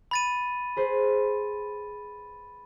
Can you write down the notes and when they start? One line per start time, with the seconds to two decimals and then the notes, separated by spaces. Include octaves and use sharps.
0.11 B5 A6 D#7
0.76 G#4 B4 C5